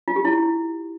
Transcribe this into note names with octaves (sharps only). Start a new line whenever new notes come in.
F4
G4
E4